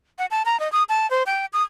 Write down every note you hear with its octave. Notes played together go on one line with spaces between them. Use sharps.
F#5
A5
A#5
D#5
D#6
A5
C5
G5
D#6